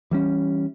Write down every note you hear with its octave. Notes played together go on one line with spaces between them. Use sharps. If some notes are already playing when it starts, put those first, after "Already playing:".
E3 G3 C#4